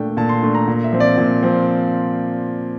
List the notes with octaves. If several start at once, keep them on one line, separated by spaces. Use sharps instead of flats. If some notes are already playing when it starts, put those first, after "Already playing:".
Already playing: A#2 A3 D4 G5
A#2 A5
C6
A3 D4
A#5
A#2
E5
F3 C4
D5
A#2
F3 C4